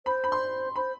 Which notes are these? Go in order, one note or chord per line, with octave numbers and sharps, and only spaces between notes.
C5 B5
B5
C6
C5 B5